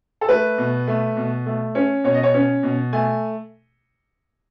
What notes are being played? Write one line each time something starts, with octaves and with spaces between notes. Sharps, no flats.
A4
A3 B4
B2
A3
B2
A3
C#4
B2 C#5
D#5
C#5
C#4
B2
A3 G#5